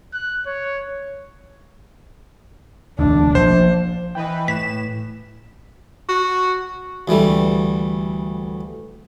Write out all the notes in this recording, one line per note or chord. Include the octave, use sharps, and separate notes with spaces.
F#6
C#5
E1 D2 D4
A#1 C5
E3 B4 D#5 G5
A2 B6 E7
F#4
D2 E3 G3 A3